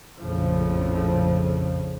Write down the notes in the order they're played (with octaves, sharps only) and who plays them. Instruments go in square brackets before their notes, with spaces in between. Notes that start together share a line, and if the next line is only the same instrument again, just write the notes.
[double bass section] A#1 F2 A2 C#3 F3